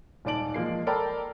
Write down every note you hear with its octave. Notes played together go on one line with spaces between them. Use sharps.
D#1 G#2 D5 A5 D7 F#7
F3 G#3 A#3 C7
A4 A#4 D5 G5 A5 B5